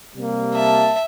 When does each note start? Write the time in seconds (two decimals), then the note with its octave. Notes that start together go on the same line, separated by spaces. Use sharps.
0.16 C3 G3 A#3
0.55 E5 A5